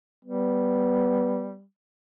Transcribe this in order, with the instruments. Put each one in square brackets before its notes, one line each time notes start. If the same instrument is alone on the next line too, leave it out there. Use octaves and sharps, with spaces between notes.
[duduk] G3 [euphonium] B3